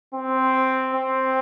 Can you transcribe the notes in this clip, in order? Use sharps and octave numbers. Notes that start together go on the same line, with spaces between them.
C4
C4